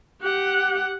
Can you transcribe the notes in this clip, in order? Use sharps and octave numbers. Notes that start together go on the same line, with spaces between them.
G4 F#5